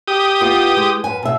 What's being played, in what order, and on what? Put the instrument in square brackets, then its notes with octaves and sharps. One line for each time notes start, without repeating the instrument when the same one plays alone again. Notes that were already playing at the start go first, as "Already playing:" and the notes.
[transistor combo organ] G4 D#6
[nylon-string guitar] B3 E4 F4
G#3
F#2 B4 G#5
B2 E5